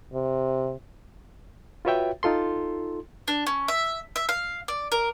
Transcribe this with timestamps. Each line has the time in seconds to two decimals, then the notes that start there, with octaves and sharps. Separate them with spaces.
0.13 C3
1.85 F4 F#4 B4 C#5 E5 G5
2.23 D#4 F4 A4 C6
3.28 D4
3.47 C#4
3.68 E5
4.16 E5
4.29 F5
4.68 D5
4.92 A#4